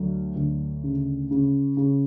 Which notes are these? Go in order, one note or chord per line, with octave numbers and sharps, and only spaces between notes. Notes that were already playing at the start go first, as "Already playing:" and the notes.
Already playing: D2 F#3
D2
C#3
C#3
C#3